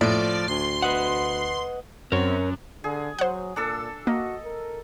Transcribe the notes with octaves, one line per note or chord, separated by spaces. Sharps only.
A2 F3 A3 D5
D2 C6
B4 D#5 F#5
F#2 C4 A#4 C#5
D3 G#4
F#3 C5 F#5
A#2 D4 A4 E6
A#3 F#4 D#5
A#4